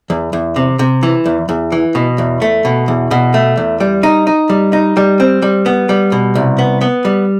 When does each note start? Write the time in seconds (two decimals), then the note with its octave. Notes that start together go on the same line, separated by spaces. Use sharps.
0.10 E2
0.33 E2
0.56 C3
0.79 C3
1.03 E3
1.26 E2
1.49 E2
1.72 E3
1.95 B2
2.18 E2
2.42 A3
2.65 B2
2.88 E2
3.11 B2
3.34 A3
3.57 E2
3.80 G3
4.03 D#4
4.27 D#4
4.50 G3
4.73 D#4
4.97 G3
5.20 C4
5.42 G3
5.66 B3
5.89 G3
6.12 B2
6.35 C2
6.59 B3
6.81 B3
7.05 G3